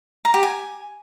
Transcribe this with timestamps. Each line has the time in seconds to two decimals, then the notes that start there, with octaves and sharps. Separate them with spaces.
0.25 A#5
0.34 G4
0.43 G#5